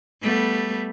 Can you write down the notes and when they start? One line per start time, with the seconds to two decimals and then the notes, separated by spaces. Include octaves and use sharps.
0.22 G3 A3 B3